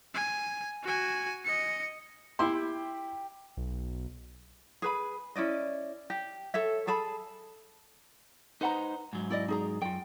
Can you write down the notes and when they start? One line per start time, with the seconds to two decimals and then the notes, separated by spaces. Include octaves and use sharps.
0.14 G#5
0.83 F#4 G#5
1.45 D#5 C#7
2.39 E4 G4 E5 C6
3.57 B1
4.82 G#4 B4 B5
5.36 C#4 E4 D5 D#5
6.10 G4
6.54 A4 C#5 E5
6.87 G#4 A4 A5 B5
8.61 D#4 B4 C5 F#5 A#5
9.13 G#2 F#3
9.30 E4 D5 D#5
9.48 D#4 G#4 A#5
9.82 F#2 F4 G5